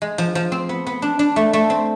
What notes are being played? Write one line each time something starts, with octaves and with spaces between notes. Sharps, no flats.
G#3
F3
F3
C4
B3
B3
D4
D4
A3
A3
C4